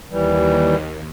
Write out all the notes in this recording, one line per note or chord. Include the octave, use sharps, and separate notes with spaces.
D#2 E3 G3